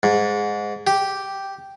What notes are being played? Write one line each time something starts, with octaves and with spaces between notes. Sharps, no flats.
G#2
G4